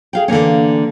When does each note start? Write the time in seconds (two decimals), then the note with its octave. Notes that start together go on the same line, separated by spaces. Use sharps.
0.13 G#4 F5 G5
0.28 D3 E3 A#3 C#4